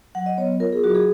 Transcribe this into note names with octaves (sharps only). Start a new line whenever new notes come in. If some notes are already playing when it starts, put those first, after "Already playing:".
F#3 F#5
D#5
B3 C#5
F4 A#4
G#4
F#3 F#4
G#4